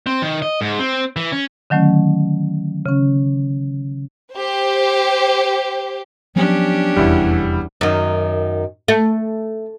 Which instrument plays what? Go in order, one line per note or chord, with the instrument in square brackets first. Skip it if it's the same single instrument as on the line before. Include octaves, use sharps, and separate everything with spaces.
[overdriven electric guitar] C4
D#3
D#5
G#2
C4
E3
C#4
[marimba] D3 D#3 F#3 A3 C#4
C#3 C#4
[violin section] G4 C5
[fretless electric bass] F3 F#3 B3 [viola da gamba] C#4 D4 G4
[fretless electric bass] F1 [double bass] E2 [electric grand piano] G3 E4
[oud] F#2 D#3
A3